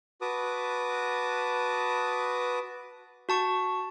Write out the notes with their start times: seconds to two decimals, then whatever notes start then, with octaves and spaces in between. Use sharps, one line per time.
0.21 F#4 B4 A5 D6 D#6
3.29 F#4 A5 C#6